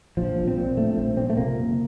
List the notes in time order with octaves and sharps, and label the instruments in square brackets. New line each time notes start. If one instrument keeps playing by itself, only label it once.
[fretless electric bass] A#1 F3
A#1
C4
A#2
A#1 A3
A#1 C4
A#2 C4
A3
C3 A#3
F#1